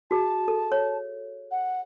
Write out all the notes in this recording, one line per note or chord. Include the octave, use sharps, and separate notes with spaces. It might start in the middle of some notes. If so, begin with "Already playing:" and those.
F#4 G#4 A5
A4
C#5
F#5